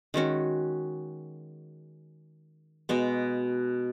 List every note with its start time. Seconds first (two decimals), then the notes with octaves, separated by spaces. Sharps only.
0.14 D#3 G#3 C#4 F#4
2.89 B2 G#3 B3